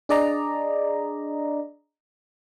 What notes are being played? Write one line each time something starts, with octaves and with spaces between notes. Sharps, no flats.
D4 G#4 D5 D#5 A#5